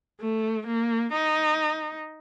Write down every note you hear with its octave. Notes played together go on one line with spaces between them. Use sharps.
A3
A#3
D#4